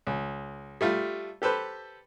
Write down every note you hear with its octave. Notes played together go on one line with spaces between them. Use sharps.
C#2
G3 A3 F4
G4 A4 B4 C5